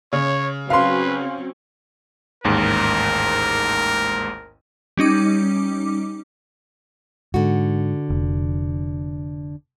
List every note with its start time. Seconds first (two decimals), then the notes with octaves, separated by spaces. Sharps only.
0.13 C#3 C#5
0.70 F#3 C4 C#4 B4 F5 C6
2.44 A1 D#2 G#2 A#4
4.97 G3 C#4 D#4 D6
7.34 G#2 D3 F#4
8.10 F1